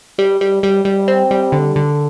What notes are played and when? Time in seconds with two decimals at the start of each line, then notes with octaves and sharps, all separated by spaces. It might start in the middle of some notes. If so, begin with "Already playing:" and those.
0.18 G3
0.41 G3
0.63 G3
0.85 G3
1.08 C4
1.31 G3
1.52 D3
1.76 D3